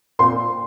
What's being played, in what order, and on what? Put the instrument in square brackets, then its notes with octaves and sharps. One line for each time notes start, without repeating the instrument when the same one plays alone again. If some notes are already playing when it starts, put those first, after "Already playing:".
[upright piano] A#2 C4 C6